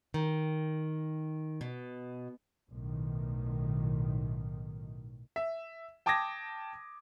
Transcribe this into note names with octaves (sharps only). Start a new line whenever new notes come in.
D#3
B2
B1 A2 D#3
E5
G5 A5 D6 D#6 G#6 A#6